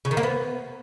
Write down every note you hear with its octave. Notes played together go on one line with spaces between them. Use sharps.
C#3
D#3
A#3
B3